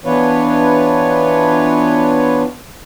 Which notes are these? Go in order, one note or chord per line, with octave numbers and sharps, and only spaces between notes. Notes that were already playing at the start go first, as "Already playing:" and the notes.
E3 B3 D4 F4 B4 C#5